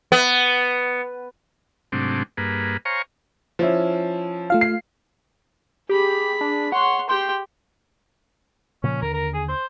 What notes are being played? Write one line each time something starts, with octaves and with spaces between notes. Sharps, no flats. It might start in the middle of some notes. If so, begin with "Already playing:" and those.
B3
G#2 C3 F#3 A3 C4 D4
G2 A#3 G#4 B4
C5 C#5 F5 G#5 A#5 C#6
F3 C#4 E4
A3 F4 F5
C7
G4 G#4 B5
D4
C#5 F#5 C6
G4 G5 C6
A#2 C#3 F3 C#4
D#2 D3 A#4
A#4
G#4
C5